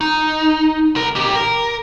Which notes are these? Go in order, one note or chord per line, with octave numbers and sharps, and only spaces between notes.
D#4
C2 A#4
A#2 G4
A#4